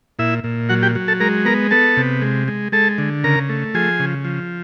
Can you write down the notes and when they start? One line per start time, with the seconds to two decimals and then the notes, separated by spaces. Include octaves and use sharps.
0.19 A#2 E4 E5
0.44 A#2
0.69 F#3 F#4 F#5
0.82 G4 G5
0.95 F#3
1.08 A4 A5
1.20 G#3 A#4 A#5
1.45 B3 A#4 A#5
1.71 B3 A4 A5
1.97 C3
2.21 G#3
2.48 G#3
2.72 G#3 A4 A5
2.98 D3
3.24 C#3 A#4 A#5
3.49 A3
3.74 F3 G#4 G#5
4.00 C#3
4.24 F3